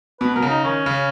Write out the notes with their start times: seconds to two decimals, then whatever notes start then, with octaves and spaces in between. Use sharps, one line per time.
0.21 B2 B4
0.35 B2 A#4
0.42 C#3
0.49 D#4
0.64 D#3 C#4
0.86 C#3